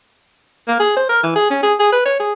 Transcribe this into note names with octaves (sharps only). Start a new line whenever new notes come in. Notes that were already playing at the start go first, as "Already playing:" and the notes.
A#3
G#4
C5
A#4
E3
G#4
C#4
G#4
G#4
B4
C#5
G#4